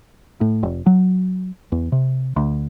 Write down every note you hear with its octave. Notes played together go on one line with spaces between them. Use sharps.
A2
F1
F#3
E2
C3
D2